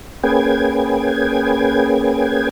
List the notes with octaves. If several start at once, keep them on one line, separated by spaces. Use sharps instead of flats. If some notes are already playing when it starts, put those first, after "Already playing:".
A#3 C#4 G#4 B4 G5 G#6